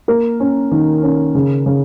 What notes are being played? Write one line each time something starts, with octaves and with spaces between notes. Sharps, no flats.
A#3 A#4
C#4
D#3
C#4
C#3
C#3